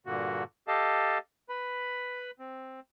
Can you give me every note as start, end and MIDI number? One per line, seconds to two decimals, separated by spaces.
0.06 0.43 43
0.06 0.43 46
0.06 0.43 50
0.06 0.43 58
0.06 0.43 66
0.68 1.18 67
0.68 1.18 69
0.68 1.18 75
0.68 1.18 77
0.68 1.18 81
1.49 2.31 71
1.49 2.31 83
2.39 2.80 60